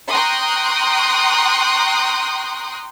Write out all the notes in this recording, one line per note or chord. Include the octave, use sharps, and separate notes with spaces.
G5 A#5 C6 C#6 D#6 F#6